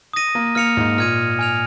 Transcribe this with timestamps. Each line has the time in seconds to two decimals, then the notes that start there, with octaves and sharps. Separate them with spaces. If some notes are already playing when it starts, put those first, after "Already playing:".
0.13 D#6 A#6 D#7
0.35 A#3
0.55 A#3 F6 C#7 F7
0.77 G#2
0.98 A#2 F6 G#6 D#7
1.39 G#5 F6 G#6 F7